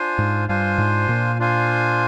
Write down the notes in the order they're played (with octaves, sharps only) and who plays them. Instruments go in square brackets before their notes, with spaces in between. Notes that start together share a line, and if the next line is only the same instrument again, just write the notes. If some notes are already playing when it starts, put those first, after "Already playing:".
Already playing: [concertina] D4 F4 C5 F5 G#5
[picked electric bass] G#2
[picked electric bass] G2 [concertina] D4 F4 C5 F5 G#5
[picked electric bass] G#2
A#2
[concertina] D4 F4 C5 F5 G#5